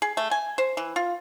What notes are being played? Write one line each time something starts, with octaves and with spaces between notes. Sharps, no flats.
G#4
A3
G#5
C5
E3
F4